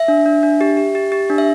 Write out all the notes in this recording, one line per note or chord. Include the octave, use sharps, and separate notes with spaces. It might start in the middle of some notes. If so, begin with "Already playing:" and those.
Already playing: E5
D4
D4
D4
G4
G4
G4
G4
D4
E5